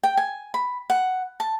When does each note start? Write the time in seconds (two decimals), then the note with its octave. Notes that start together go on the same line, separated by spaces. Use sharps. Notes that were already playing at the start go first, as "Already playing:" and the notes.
0.03 G5
0.17 G#5
0.54 B5
0.90 F#5
1.40 A5